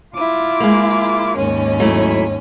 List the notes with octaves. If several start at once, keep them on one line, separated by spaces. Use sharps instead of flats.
E4 F4 D6
G#3 A#3
D#2 G#2 C#4
F#3 A3 E4